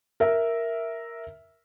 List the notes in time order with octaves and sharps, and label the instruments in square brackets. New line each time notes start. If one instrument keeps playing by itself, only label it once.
[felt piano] A#4 E5